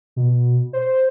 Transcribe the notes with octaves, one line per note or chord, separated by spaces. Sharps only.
B2
C5